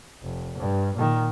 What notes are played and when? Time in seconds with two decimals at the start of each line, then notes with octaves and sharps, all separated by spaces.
0.23 F1
0.58 G2
0.95 A#2 D#3